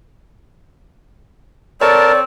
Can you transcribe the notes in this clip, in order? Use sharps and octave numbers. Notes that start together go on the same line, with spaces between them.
C4 A4 A#4 C#5 D5 A5